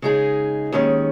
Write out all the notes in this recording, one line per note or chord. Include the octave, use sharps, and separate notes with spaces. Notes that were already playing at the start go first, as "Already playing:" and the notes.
C#3 G#3 D#4 G#4
D#2 D#3 G#3 C#4